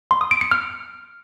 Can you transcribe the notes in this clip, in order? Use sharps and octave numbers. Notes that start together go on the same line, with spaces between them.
C6
D#6
D7
C#7
F6